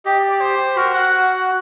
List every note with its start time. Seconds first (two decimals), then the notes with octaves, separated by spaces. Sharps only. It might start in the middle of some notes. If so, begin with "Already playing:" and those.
0.05 G4 D#5
0.18 D5
0.30 D5
0.40 C5
0.76 F#4 A#4
0.94 F#5